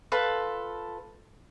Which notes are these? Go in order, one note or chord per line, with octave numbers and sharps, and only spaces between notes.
F4 A4 B4